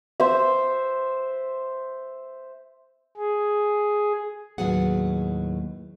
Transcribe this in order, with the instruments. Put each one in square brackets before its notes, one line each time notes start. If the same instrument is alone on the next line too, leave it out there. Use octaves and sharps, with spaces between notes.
[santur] C5 E5
[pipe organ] G#4
[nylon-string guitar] D#2 A2 F#3 B3 G#4 F#5